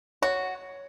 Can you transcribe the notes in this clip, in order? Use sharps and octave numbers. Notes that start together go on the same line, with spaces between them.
F#4 C#5